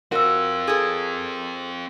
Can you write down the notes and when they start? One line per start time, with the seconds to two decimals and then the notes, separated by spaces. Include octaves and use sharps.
0.12 C4 F4 F#4 A#4 E6
0.68 G#4 A4